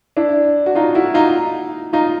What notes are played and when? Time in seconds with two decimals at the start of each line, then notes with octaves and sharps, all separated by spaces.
0.17 D4 E4
0.66 F#4
0.75 D#4 F4
0.95 E4 F#4
1.14 D#4 F4
1.93 D#4 F4